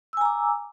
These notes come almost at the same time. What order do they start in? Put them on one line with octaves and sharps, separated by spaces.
E6 G#5 A#5 D6